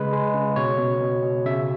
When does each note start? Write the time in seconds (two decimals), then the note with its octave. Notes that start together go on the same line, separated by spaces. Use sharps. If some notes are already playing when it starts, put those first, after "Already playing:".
Already playing: C#3 G#3 B4
0.12 G#3
0.34 C#3
0.56 B2 C#5
0.78 B2
1.01 B2
1.23 B2
1.46 C#3 E5